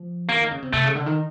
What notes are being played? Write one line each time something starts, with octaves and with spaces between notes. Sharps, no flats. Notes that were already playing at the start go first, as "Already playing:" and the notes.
Already playing: F3
E3 A#3
D#3
C#3
C3
C3 A3
C#3
D3
D#3